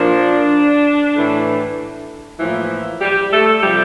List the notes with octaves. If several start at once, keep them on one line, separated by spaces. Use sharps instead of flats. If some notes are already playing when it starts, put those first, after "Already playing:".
Already playing: A#2 F3 A#3 D4
A2 E3 A3
A2 E3 F3 A#3 E4
G3 G4
A3 A4
C3 F3 G3 G4